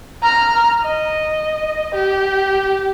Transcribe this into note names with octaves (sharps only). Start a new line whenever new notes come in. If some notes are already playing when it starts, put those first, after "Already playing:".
A#5 F6
D#5
G4